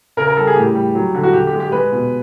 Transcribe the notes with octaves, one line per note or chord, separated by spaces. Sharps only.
C#3 A#4
A#4
G3 A4
G#4
A2 G4
G3
F#3
D3
F#4
D3 G4
G4
G#3
G4
G#3 B4
B2